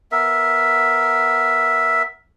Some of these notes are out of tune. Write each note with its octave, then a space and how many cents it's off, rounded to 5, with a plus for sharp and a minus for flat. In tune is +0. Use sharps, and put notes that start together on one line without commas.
B3 +0 A#4 +5 E5 +0